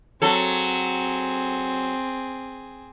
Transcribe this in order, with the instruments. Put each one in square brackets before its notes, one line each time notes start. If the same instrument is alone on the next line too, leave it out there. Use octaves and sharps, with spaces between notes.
[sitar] F#3 A4 [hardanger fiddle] C4 G#4